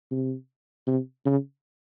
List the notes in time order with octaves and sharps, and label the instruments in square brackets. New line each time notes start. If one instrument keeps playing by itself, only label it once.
[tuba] C3
C3
C#3